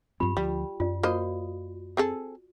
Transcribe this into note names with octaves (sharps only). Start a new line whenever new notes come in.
G2 F#3 C4 F4 G4 B5
D2 F3 G3
F#2 F4 D5
A#3 F#4 C5 D#5
C4 G#4 A4